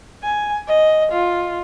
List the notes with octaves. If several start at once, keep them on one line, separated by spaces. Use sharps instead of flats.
G#5
D#5
F4